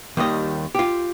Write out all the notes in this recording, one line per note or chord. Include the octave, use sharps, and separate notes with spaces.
D#2 D#3 G3 D#5
F4 G4